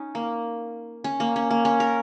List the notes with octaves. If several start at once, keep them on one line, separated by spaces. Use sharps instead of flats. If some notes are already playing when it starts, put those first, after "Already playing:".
Already playing: C#4 D#4
A#3
C#4
A#3
C#4
A#3
C#4
A#4